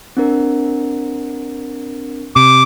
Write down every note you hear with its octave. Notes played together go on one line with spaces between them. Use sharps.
C4 D4 A#4
C3 D6